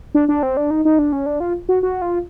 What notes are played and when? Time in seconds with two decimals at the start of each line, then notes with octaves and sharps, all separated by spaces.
0.15 D4
0.29 D4
0.43 C4
0.57 D4
0.71 D#4
0.85 D#4
0.99 D4
1.13 C#4
1.26 D4
1.40 F4
1.69 F#4
1.83 F#4
2.02 F4